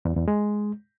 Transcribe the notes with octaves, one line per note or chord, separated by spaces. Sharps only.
E2
E2
G#3